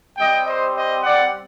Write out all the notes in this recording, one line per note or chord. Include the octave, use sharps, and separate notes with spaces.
G3 C4 G4 D#5 G5
C5 D#5
C5 D#5
D5 F#5